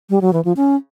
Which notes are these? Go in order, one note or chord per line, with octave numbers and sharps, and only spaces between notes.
G3
F#3
E3
F3
C#4